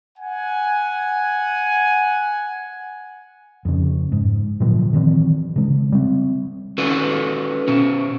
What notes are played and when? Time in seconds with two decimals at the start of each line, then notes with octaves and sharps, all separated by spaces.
0.18 F#5 G#5
3.65 F2 C#3
4.12 G#2
4.60 A#2 D3 F3 F#3
4.93 D#3 E3 F#3 C4
5.56 C#3 G#3
5.92 G3 C4
6.78 C#4 F#4 A4 B4
7.68 B2 C#4